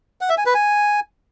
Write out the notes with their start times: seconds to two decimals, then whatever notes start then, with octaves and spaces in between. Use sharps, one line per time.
0.21 F#5
0.29 E5
0.38 G#5
0.46 B4
0.54 G#5